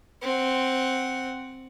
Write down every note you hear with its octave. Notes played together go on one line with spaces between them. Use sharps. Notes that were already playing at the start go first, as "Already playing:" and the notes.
C4 F#5